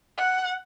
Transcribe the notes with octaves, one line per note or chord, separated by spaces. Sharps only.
F#5